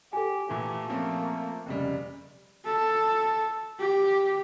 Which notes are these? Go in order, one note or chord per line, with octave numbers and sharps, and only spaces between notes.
G4 A4 G#5
A#2 E3 A3 G4
F3 A#3 C4 C#4
F1 C#3 G3
A4
G4